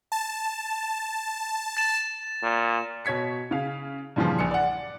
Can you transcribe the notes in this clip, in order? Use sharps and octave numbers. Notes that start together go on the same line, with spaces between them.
A5
A6 E7
A#2
B2 C#5 G#6 B6 C#7
C#3 F5
G2 A#2 C#3 E3 F3
A#1 C#7
D5 F#5